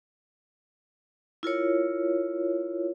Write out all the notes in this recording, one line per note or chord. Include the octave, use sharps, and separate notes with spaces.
E4 F4 A#4 C#5